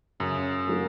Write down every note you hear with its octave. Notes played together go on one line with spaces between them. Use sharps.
F#2 C#3
F#3 A#3